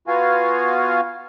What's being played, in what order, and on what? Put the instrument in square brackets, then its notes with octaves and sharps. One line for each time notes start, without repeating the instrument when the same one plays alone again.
[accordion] B3 F4 F#4 F5 G#5